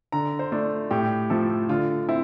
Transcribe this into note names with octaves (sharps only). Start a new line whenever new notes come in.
D3 A#5
C5
A3 D4
A2 G4
F3 A3 A4
D3 F4
C4 E4